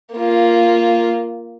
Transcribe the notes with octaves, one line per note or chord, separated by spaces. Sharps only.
A#3 F4